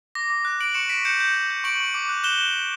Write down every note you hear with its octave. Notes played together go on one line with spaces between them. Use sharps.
D6 A#6
D6
F#6
F#6 D7 F#7
C#6 C#7 E7
C#6 B6 D7
G6 C#7 E7
G6
G6
G6
C#6 D7 F#7
C#6
D6
F#6
F#6 E7 G7